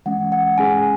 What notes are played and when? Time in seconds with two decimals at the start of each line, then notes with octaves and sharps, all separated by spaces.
0.06 E3 G#3 C#4 F#5
0.32 F#5
0.58 G#3 C#4 G#4 G#5